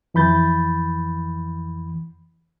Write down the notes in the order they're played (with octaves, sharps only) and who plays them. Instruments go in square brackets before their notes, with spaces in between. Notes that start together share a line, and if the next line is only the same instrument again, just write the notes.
[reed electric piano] F2 E3 B5 G6 A6